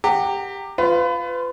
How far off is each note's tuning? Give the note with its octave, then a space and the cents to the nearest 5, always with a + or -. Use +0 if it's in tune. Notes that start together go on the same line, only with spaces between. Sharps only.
G4 +15 F#5 +0 A#5 -20
F4 +0 B4 +30